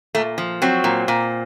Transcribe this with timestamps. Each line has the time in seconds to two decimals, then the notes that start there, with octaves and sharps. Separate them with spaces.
0.15 A#2 A3
0.38 F3
0.62 F#3 C4
0.84 A#2
1.08 A#2